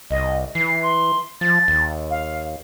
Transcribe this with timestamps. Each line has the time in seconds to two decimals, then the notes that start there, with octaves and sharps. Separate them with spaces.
0.11 C2 D#5
0.55 E3 C7
0.83 C6
1.41 F3 A6
1.68 D#2
2.10 F5